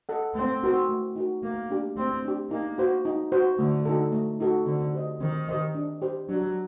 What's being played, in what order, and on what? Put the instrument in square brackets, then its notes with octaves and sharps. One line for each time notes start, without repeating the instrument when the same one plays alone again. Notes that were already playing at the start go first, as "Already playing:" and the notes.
[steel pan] A4 D#5 F#5
[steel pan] A3 [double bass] C4
[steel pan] D#4 F#4 A#4
A3
D#4 F#4 A#4
[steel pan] A3 [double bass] A#3
[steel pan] D4 G4
[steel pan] A3 [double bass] C4
[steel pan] D4 G4
[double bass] A#3 [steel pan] D#4
[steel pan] F#4 C5
D#4
F#4 C5
[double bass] D3 [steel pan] A3
[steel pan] D#4 F#4 A4
A3
D#4 F#4 A4
[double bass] D3 [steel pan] C4
[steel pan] G4 C5 D#5
[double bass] D#3 [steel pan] C4
[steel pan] G4 C5 D#5
D4
G4 C5
[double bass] F#3 [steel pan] D4